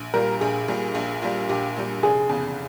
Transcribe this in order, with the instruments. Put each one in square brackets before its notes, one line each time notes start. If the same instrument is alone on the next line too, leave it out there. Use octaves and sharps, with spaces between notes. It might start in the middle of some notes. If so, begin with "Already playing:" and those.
Already playing: [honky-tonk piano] A#1
[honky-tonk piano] A#2 G3 [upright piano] A#4
[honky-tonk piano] A#1 [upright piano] G#4
[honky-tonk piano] A#2 G3
A#1
A#2 G3
[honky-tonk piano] A#1 [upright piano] G4
[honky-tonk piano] A#2 G3
[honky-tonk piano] F1 [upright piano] G#4
[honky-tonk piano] E2 C#3